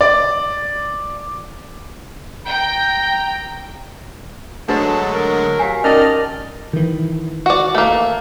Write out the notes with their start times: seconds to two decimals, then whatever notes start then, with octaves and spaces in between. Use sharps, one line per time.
0.01 D5
2.47 G5 A#5
4.68 D3 F#3 G#3 A3 D4 B4 F#5 A5
5.14 A#4
5.59 G4 F5 G#5
5.84 D#3 C#4 A#4 D5 D#5 A5 F6
6.73 D#3 E3
7.46 F#4 D5
7.75 A3 A#3